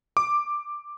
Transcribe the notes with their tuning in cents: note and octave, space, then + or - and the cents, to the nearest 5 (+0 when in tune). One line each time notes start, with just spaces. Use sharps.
D6 +5